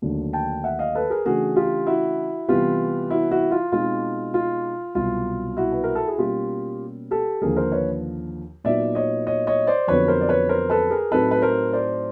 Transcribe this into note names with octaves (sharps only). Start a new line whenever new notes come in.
D#2 D3 F#3 A3 D4
G5 A5
E5 F#5
D#5 F5
A4 B4
G#4 A#4
C#3 E3 A3 D4 F#4 G#4
F4 G4
E4 F#4
C3 E3 G3 B3 F4 G4
E4 F#4
E4 F#4
F4
B2 G#3 C4 D#4 F4
F4
C2 B2 F#3 F4
E4 F#4
B4
A#4
A4
G#4
B2 G3 A#3 C#4 F4 G4
G4 A4
D#2 D3 F3 A#3 G#4 A#4
A#4 C5
B4 C#5
A#2 F#3 B3 D#4 D5 E5
C#5 D#5
C#5 D#5
C#5 D#5
C5 D5
F2 D3 F#3 B3 B4 C#5
A#4 C5
D5
B4 C#5
A#4 C5
A4 B4
G#4 A#4
A2 F#3 A3 C4 D#4 A4 B4
B4
A#4 C5
C5 D5